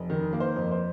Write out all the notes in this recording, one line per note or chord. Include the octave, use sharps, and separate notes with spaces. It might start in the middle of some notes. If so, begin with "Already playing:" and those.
Already playing: F1
D#3
A#3
C5
F2
C5